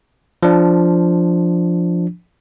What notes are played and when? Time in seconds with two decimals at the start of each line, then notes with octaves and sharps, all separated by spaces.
0.43 F3 D4